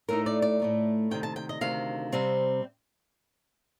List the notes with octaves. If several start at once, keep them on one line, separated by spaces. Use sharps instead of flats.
A2 A3 D#4 A#4
D5
D5
A2 A3 D#4
D2 C3 D#3 G5
A5
G5
D#5
D2 C3 D#3 F5
C3 G3 C4